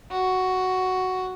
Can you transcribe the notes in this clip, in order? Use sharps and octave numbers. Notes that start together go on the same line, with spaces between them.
F#4